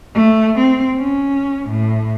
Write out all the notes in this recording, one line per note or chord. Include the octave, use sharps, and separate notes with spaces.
A3
C4
C#4
A2